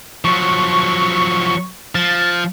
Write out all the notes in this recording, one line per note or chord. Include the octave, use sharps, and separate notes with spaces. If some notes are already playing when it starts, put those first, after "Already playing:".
F3 F#3 C#6
F3 A6